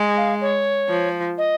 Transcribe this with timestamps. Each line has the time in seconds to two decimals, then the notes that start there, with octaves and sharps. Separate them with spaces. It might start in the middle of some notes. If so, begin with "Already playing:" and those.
Already playing: G#3
0.17 F5
0.41 C#5
0.89 F3
1.38 D#5